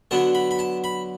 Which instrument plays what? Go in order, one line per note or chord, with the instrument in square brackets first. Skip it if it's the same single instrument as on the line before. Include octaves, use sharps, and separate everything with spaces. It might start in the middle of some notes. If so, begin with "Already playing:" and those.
[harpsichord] D3 F#3 B3 A5
B5
B5
A5
B5